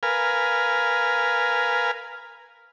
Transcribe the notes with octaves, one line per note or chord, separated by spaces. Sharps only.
A#4 B4 F5 G#5